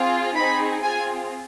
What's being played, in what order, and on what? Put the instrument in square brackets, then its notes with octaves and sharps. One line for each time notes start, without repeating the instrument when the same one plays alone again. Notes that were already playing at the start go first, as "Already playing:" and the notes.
Already playing: [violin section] C4 F4 G#4
C4 D#4 G#4 B5
C4 F4 G#4 G#5